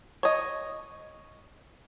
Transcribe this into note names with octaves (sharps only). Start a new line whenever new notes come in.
C#5 D#5